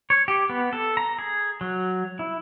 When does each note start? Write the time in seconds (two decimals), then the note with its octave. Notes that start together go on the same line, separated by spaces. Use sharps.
0.10 C#5
0.28 G4
0.50 B3
0.73 A4
0.97 A#5
1.19 G#4
1.61 F#3
2.19 E4